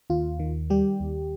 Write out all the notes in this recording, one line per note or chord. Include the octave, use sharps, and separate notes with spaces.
D#2 F4
D#3
G3 G4
D#2